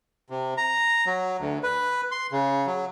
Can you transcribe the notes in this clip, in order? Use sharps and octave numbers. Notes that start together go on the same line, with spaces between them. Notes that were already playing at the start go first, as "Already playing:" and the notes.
C3
A#5
F#3
D2
B4
C6
C#3
F#3